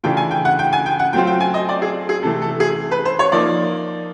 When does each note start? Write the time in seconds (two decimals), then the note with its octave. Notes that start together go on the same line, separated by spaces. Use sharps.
0.03 C#3 E3 A3 D4 F4 G5
0.17 G#5
0.31 G5
0.45 F#5
0.59 G5
0.73 G#5
0.86 G5
0.99 F#5
1.13 F#3 A3 C4 F4 G5
1.27 G5
1.40 G#5
1.54 D#5
1.69 D5
1.82 G#4
2.09 G#4
2.23 C3 E3 A3 A4
2.42 A4
2.60 G#4
2.91 B4
3.05 C5
3.19 C#5
3.32 F3 A#3 D#4 D5